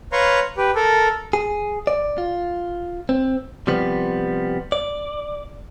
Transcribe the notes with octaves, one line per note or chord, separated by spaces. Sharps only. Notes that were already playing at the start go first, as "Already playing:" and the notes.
B4 C#5 F5 A#5 C6 C#6
G4 B4
A4 A#4
G#4
D5
F4
C4
C3 F3 G3 B3
D5